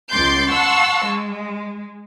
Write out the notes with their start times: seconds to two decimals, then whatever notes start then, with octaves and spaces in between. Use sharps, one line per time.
0.12 C#2 C6 D6 G6 A6
0.51 F#5 A5 C6 C#6 E6
1.06 G#3